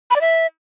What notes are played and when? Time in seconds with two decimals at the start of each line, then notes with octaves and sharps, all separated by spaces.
0.11 B5
0.16 D5
0.21 E5